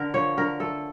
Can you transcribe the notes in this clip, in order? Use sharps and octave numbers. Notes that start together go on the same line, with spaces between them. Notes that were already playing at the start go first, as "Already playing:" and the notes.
Already playing: D3 A#4
F3 C#5
D3 A#4
A3 A4